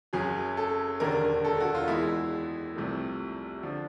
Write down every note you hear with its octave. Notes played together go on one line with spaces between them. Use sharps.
F#1 F#2 C#3 F#3 G#4
A4
E1 D#2 D3 A#4
A4
F#4
F4
E2 B2 G#3 E4
C2 C3 F3 A3
D3 F3